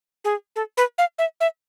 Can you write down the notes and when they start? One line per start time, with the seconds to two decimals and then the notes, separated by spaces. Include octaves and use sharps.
0.24 G#4
0.56 A4
0.77 B4
0.98 F5
1.18 E5
1.40 E5